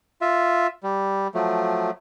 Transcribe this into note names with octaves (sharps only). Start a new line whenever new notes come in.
F4 E5
G3
F3 F#3 A3